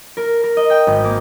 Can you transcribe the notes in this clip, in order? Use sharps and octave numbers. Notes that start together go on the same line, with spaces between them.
A#4
A#4
D#5
G5
G#1
A#3